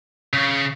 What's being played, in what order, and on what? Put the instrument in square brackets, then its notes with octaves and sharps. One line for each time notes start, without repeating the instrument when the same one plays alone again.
[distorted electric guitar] C#3